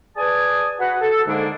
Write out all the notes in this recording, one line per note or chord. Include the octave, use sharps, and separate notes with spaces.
G#4 B4 D5 G#5 A5 D#6
F#4 B4 F#5
A4
G#2 D3 G#3 A#3 D4 D#4